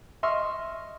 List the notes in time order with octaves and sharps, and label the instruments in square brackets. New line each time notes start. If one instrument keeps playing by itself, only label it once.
[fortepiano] D#5 E5 C6 C#6 F6